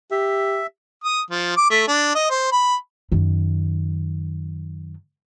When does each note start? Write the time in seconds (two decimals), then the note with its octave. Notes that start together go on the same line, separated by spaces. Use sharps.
0.11 G4 E5
1.04 D#6
1.31 F3
1.57 D6
1.70 A3
1.88 D4
2.15 D#5
2.30 C5
2.52 B5
3.12 F#2 D#3